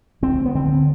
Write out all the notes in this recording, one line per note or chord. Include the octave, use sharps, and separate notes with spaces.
D2 C4
B3
D3 C4